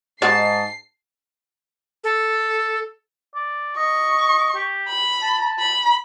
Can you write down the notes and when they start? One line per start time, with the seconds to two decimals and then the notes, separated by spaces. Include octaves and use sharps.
0.22 G#2 G#3 F#4 D5 A5 C7
2.04 A4
3.35 D5
3.77 D#5 C#6
4.55 G4
4.89 B5
5.22 A5
5.59 B5